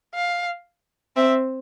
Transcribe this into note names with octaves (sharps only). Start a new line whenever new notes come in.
F5
C4 E5